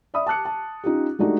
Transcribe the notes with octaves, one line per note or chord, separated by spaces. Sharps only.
D5 E5 B5 D#6
A5 D6 F#6 C#7
A5
C#4 D#4 F4 G4
G#3 A3 D4 D#4 F#4 G4